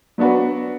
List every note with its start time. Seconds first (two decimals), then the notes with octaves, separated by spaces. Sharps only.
0.18 F#3 B3 D4 F#4 B4